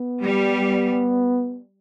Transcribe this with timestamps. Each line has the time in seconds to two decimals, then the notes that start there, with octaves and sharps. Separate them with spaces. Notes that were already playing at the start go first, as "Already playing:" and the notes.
Already playing: B3
0.23 G3